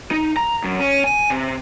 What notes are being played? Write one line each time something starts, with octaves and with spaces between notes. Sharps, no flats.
D#4
A#5
F#2
C#4
G#5
C3